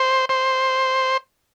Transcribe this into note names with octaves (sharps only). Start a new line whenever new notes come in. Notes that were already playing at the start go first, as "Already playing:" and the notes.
Already playing: C5
C5